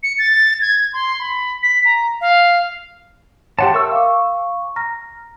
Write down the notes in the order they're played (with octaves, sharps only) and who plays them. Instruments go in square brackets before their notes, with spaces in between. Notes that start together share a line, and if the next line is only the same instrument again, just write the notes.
[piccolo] C#7
A6
G#6
C6
B5
B6
A#5
F5
[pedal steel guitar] G4 F#5 A5 [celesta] C#5 C6
[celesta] A#4 E5 [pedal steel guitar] C#6 E6
[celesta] F5 D6
A#5 F6 A#6